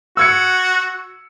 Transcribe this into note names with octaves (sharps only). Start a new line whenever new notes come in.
F#4 E6 G#6 C#7